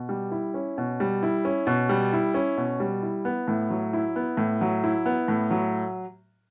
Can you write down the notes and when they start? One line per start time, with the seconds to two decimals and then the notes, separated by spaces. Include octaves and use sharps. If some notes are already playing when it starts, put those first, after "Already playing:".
Already playing: B2
0.09 G3
0.31 E4
0.54 C#4
0.78 B2
1.00 G3
1.23 E4
1.45 C#4
1.67 B2
1.89 G3
2.13 E4
2.34 C#4
2.57 B2
2.80 G3
3.03 E4
3.25 B3
3.48 A2
3.70 F#3
3.93 E4
4.16 B3
4.37 A2
4.61 F#3
4.84 E4
5.06 B3
5.28 A2
5.51 F#3